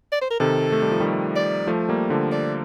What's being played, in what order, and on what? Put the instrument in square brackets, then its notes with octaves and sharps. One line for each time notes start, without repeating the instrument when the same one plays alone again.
[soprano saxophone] D5
C5
A#4
[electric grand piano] C3 D#3 [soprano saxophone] A4
[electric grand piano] A3
G3
F3
D#3 G3
[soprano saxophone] D5
[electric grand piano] F3 A3
G3 A#3
D3 F3
[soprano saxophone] D5